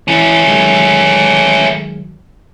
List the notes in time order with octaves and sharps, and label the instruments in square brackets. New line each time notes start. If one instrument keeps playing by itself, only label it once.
[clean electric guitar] E3 [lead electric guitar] A3 C#4
[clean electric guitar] D#3 F#3 G#3